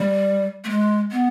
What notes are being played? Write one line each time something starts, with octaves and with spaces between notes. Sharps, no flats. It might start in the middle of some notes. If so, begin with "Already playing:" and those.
Already playing: G3
A3
G#3
B3